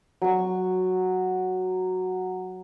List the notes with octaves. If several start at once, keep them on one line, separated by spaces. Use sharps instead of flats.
F#3 C#6